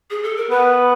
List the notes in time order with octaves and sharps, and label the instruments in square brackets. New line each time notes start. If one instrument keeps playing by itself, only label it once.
[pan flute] G#4
A4
A#4
[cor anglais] B3 [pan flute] B4